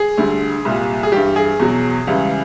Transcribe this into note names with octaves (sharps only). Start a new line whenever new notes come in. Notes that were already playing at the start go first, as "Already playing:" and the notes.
Already playing: G#4
D2 D3 G3
C2 A#2 G3
G#4
G2 E3 G3 G4
G#4
E2 B2 F#3
C#2 C#3 E3 G3